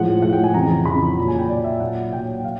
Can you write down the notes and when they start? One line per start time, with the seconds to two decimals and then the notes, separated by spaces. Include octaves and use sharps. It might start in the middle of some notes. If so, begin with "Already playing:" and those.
Already playing: A2 F3 G#3 F#5
0.22 A2 F3 G#3 F#5
0.33 G5
0.44 G#5
0.54 F2 C#3 E3 A#5
0.86 F2 C#3 E3 B5
1.18 A#2 F#3 A#5
1.28 G#5
1.39 G5
1.49 A#2 F#3 D5
1.64 E5
1.80 A#2 F#3 F#5
2.12 A#2 F#3 G5
2.44 F#3 F5